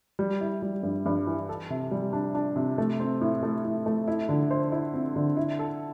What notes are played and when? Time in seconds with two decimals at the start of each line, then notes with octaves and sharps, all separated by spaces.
0.19 G3
0.41 E4
0.62 G3
0.83 G2
1.06 G2
1.27 E3
1.49 A4
1.70 C3
1.91 G3
2.13 D4
2.35 D4
2.56 C3
2.78 A3
3.00 C4
3.21 A2
3.43 A3
3.65 A2
3.86 A3
4.08 E4
4.29 D3
4.51 C5
4.72 E4
4.94 C4
5.16 D3
5.37 E4
5.59 A4